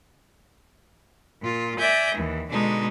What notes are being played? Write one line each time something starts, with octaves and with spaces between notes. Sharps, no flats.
A#2 F4
D5 E5 G#5 G6 A#6
D#2 E3
B2 D3 G#3 D4 D#4